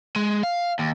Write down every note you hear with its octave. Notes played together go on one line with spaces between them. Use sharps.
G#3
F5
D#2